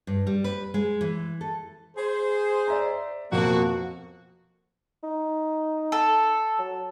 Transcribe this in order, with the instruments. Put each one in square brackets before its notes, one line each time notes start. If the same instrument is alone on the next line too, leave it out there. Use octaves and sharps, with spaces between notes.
[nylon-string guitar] G2
G3
B4
G#3
E3
A4
[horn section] G#4 C5
[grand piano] D5 E5 A#5
[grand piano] F2 B2 C4 [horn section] A#3 F#4
[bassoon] D#4
[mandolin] A4
[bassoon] F#3